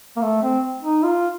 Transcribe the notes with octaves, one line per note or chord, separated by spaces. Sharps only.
A#3
A3
C4
D#4
F4